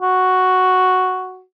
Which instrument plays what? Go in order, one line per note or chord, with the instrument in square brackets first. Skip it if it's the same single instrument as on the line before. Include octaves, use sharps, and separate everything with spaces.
[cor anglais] F#4